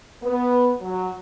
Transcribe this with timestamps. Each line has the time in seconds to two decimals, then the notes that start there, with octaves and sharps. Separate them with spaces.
0.23 B3
0.81 F#3